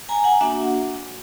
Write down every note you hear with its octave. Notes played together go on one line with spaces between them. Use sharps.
G#5 A#5
F#5 G#5
A#3 D4 F#4 E5 F#5